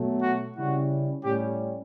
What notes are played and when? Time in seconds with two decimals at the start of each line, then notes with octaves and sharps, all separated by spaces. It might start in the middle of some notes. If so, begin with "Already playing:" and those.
Already playing: B2 F#3 A3
0.22 F#4
0.55 C#3 G3 C#4 E4 F#4
1.24 A2 G3 C#4 G4